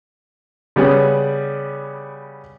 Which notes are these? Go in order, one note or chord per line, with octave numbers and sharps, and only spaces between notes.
C#3 G3 B3 C#4